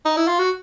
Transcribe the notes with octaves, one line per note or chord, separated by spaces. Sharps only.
D#4
E4
F4
F#4